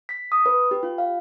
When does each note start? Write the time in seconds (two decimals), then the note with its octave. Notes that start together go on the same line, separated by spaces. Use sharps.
0.09 B6
0.32 D#6
0.46 B4
0.71 G4
0.83 F4
0.98 F5